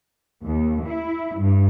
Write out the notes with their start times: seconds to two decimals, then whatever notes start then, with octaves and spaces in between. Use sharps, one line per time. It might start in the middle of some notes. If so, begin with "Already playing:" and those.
0.45 D#2
0.86 E4
1.38 G2